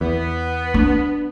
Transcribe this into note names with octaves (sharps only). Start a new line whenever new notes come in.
E2 B3
D4